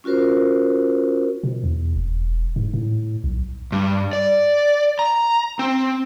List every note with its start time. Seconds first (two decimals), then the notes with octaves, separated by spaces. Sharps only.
0.04 C#4 F4 F#4 A#4 C5
1.43 B2
1.64 E2
1.96 E1
2.56 G#2
2.74 A2
3.24 B1
3.72 G2
4.13 D5
4.99 A#5
5.59 C4